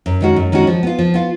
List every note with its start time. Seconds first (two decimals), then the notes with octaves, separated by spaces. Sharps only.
0.06 F#2
0.21 D#3 G#3 C#4 F#4
0.36 F#2
0.52 D#3 G#3 C#4 F#4
0.67 F3
0.83 B3 F4
0.99 F3
1.14 B3 F4